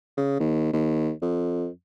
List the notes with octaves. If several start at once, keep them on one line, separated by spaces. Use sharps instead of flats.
C#3
D#2
D#2
F2